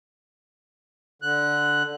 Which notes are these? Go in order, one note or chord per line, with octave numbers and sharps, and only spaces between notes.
D3 F#6